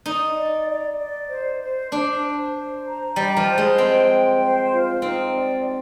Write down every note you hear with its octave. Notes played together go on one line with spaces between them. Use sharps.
D#4 D5
D5
D5
D5
C5
C5
D4 C5
C5
C5
A#5
G3 D#5
F3
C5
G#3
C4 G5
G5
C5
F4
C4 D#4
D5
G5